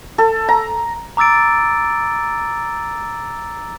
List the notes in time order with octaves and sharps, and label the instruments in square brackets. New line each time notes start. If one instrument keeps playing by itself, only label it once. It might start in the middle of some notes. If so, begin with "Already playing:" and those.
[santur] A4
A#5
[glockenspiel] A#5 D6 E6 A6 D7